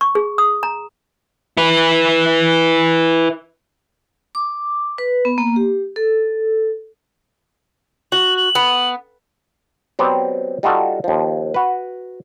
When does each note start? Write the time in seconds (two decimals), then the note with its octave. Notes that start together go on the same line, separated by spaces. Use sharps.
0.01 C#6
0.15 G#4
0.38 D#6
0.63 A#5
1.57 E4 B4
4.35 D6
4.98 B4
5.25 B3
5.38 A#3
5.56 G4
5.96 A4
8.12 F#4 F#7
8.37 F#7
8.55 B3
9.99 F#3 B3 C4 G4 D5
10.63 G3 D#4 F4 F#4 A4
11.04 D#2 F3
11.54 F#4 B4